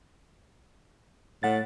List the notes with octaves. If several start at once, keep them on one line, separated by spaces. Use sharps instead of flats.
A2 A3 F#5 A6